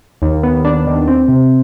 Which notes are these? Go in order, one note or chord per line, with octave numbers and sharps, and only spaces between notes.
D#2
B3
D4
D#3
C4
C3